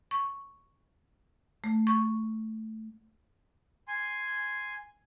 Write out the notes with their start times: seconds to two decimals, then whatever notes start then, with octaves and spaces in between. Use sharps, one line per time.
0.11 C#6
1.64 A3
1.87 C#6
3.88 G#5 C6